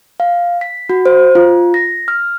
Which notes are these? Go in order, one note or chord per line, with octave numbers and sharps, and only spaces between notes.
F5
B6
F#4
C5
F4
A#6
F6